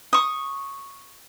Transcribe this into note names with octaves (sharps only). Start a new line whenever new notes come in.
C#6 D#6